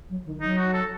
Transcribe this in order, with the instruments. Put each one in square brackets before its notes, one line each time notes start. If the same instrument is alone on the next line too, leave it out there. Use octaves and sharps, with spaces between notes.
[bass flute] F#3
D#3
[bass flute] F#3 [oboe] D#4
[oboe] F#4
A4